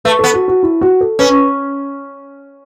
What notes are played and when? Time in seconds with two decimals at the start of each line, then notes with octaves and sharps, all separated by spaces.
0.05 A3 B4
0.19 B3 A4
0.34 F#4
0.48 F#4
0.63 E4
0.81 F#4
1.01 A4
1.19 C#4 B4